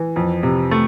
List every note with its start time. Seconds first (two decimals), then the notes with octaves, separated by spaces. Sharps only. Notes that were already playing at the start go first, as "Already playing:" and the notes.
Already playing: E3
0.16 F2
0.43 C3
0.71 A3